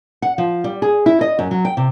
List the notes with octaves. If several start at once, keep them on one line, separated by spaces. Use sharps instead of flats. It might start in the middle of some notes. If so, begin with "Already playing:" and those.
F#5
F3
G3
G#4
E4
D#5
F#2
F#3
G5
C3